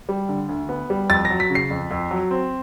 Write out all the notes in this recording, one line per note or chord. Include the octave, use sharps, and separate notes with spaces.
G3
D3
D2
B3
G3
F2 A6
A#6
F#3
B6
C#3
C7
F2
F2
F#3
C4